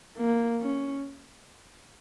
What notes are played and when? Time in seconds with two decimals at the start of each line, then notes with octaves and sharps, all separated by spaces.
0.18 A#3
0.62 C#4